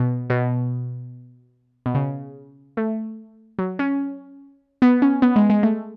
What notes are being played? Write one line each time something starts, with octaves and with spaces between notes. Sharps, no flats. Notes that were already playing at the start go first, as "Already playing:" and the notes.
Already playing: B2
B2
B2
C#3
A3
F#3
C#4
B3
C#4
B3
G#3
G#3
A3